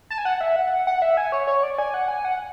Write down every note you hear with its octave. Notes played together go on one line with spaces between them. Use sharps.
A5
G#5
F#5
E5
F#5
F#5
E5
G#5
C#5
C#5
D5
G#5
F#5
G#5
F#5